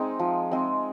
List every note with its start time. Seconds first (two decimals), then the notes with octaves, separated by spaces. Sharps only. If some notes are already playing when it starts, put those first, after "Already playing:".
Already playing: G#3 C4 D#4
0.19 F3
0.52 G#3 C4 D#4